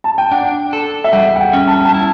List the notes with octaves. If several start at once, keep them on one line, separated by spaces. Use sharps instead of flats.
A5
G5
D4 F#5
A4
E5
G3 F#5
F#5
G5
C#4
A5
A5
E4